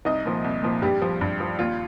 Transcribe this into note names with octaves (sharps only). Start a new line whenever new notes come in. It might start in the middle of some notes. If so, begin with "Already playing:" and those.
C2 D#4 D#5
A#2 F3
C2
A#2 F3
G2 G3 G4
F3
G2
F3
D#2 F4